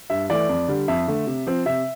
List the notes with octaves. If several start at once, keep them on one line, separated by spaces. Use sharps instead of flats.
G2 E5
E3 A3 D5
F2
D3 G3
F2 E5
D3 A3
C3
F3 C4
C3 E5